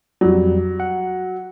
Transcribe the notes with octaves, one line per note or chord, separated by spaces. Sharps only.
F2 F#3 G3
F#5